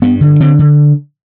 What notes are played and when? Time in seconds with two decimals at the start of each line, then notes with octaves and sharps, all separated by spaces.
0.02 G2 B3
0.21 D3
0.40 D3 C4
0.59 D3